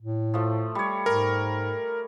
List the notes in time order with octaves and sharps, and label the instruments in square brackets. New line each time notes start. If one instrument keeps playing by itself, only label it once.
[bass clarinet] A2
[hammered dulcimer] F3 A3
G3 C#5
[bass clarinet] G#2 [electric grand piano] A#4